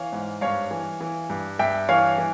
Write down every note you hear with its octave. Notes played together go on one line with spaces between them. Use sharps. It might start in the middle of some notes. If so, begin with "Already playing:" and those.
Already playing: E3 C#5 F5
G#2
G2 C#5 F5
E3
E3
G2
G2 E5 G5
E3 C#5 F5
E3